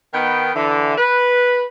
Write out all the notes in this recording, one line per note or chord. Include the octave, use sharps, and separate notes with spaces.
D#3 B3 G5
D3 E3
B4